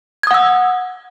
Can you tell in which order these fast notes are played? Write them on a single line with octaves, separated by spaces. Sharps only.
G#6 D#6 F#5 E6